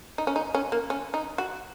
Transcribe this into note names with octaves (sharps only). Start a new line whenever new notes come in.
D#4
C#4
D#4
C#4
A#3
C#4
D#4
F#4